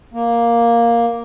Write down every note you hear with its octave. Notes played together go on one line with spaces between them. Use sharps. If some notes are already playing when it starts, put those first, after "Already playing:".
A#3